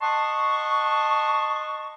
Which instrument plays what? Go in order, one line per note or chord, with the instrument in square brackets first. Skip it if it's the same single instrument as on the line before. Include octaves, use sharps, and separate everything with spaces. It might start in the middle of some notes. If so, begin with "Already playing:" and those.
[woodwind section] D#5 F#5 A5 C6 C#6